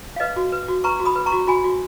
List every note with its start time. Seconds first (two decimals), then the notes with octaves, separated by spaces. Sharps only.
0.16 F5
0.20 B4 D#5
0.36 F#4
0.52 B4
0.68 F#4
0.84 B4 A#5 C#6
1.00 F#4
1.05 B5 D#6
1.16 B4
1.26 A#5 C#6
1.32 F#4
1.47 F#4 G#5 B5
1.64 F#4